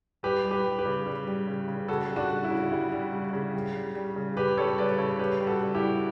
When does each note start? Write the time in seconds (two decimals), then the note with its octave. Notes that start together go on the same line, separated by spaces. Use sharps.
0.23 G3 G4 B4
0.44 G3
0.51 G4 B4
0.65 G3
0.79 G4 B4
0.85 C#3
1.06 G3
1.27 G3
1.47 C#3
1.68 C#3
1.88 C#3 F#4 A4
2.10 G3
2.16 D4 F#4
2.30 C#3
2.44 E4
2.51 C#3
2.71 G3 E4
2.92 G3
3.12 C#3
3.33 C#3
3.54 G3
3.75 G3
3.95 G3
4.16 C#3
4.37 C#3 G4 B4
4.57 G3 A4 C#5
4.78 C#3 B4 D5
4.98 C#3 A4 C#5
5.19 G3 G4 B4
5.40 G3
5.47 F#4 A4
5.61 C#3
5.75 E4 G4
5.82 G3